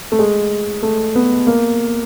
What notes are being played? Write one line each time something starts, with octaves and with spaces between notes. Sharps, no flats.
A3
G#3
A3
B3
A#3